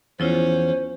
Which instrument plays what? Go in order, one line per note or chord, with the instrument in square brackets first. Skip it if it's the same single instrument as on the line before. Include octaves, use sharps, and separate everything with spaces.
[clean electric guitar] E2 [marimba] F3 E4 F4 [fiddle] C#4 [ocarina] C5